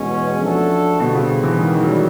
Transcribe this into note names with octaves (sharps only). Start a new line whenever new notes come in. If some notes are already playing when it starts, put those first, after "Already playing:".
Already playing: E2 B2 G#3 C#4
F3 A3 D4 F#4 A4
B2 D3 G3 C4 F4
C#3
E3
D#3 E3 G#3 B3
D#3
F#3
G3